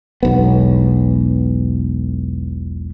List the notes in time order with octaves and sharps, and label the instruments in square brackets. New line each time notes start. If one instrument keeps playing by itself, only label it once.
[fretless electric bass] E1 B1 B3